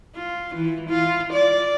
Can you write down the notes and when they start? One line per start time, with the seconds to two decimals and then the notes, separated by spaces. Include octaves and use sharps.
0.16 F4
0.55 E3
0.90 F4
1.33 D5